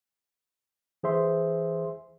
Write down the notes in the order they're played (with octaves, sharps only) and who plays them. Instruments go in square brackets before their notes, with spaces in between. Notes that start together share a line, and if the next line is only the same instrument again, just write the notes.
[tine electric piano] E3 G#4 C5 E5 C6